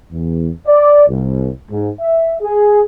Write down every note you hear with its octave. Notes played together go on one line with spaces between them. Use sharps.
E2
D5
C2
G#2
E5
G#4